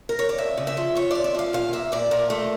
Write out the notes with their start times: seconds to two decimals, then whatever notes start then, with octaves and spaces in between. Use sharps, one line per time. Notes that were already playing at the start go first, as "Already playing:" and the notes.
0.09 A#4
0.19 C#5
0.29 D5
0.38 F2 E5
0.57 C#3
0.67 E5
0.77 F3
0.95 F2 C#5
1.11 F2 D5
1.24 E5
1.35 F3 F5
1.53 A#2 F5
1.73 A#2 E5
1.92 A#2 D5
2.11 A#2 A#4
2.30 A3